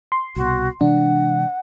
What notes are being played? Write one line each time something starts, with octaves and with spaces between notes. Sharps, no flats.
C6
C2 B2 F#4
C3 E3 G#3 D4 F#5